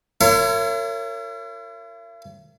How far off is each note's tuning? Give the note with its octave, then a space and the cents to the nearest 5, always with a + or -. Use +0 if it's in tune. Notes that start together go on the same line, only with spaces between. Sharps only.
E4 +45 A#4 -35 C#5 +0